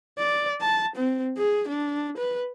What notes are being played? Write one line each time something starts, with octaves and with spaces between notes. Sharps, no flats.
D5
A5
C4
G#4
D4
B4